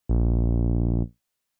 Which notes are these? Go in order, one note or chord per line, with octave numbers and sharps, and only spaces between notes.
A#1